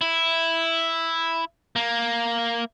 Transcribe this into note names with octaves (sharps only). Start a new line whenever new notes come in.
E4
A#3